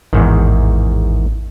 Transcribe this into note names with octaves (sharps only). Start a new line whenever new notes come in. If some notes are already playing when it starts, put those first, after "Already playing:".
A1 E2 G#2 D#3